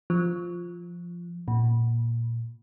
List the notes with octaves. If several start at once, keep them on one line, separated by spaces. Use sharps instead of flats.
F3
A#2